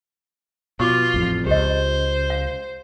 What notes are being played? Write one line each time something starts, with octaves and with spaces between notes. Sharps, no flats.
B2 F4 C#6 D6
A1 F2
C#2 G4 C5 D#5
F5